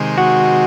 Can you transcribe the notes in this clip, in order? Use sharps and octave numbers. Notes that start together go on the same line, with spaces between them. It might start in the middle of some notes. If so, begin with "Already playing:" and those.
Already playing: C3 D#3 G#3
F#4